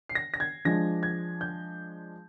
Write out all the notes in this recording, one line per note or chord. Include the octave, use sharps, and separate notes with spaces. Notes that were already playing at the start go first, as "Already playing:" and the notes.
C7
A#6
A#6
G#6
F3 G#3 D4 A#6
G#6
G6